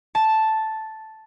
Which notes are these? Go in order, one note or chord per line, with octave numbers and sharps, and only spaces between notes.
A5